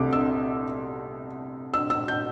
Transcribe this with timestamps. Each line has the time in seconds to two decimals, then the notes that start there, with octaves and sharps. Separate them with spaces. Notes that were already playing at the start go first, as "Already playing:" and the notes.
Already playing: C2 C3 A3 C4 D6
0.13 E6
1.74 E6
1.90 E6
2.08 G6